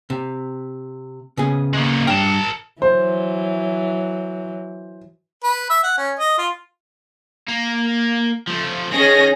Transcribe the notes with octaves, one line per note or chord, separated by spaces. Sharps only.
C3
C#3 B3 G#4
G#3 A#3
G2 D4 A#4 G5 A5
E3 F#3 C5
B4
E5
F#5
C#4
D#5
F4
A#3
F3 A3
D#3 C#4 G#4 A#6